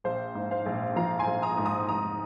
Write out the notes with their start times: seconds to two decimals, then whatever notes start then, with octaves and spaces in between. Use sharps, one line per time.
0.04 A#1 C5 F5
0.35 G#2
0.51 C5 F5
0.66 A#1
0.96 F3 F5 A#5
1.19 G#5 C6
1.27 A#1
1.42 A#5 D#6
1.58 G#2
1.65 A#5 D#6
1.88 F1 A#5 D#6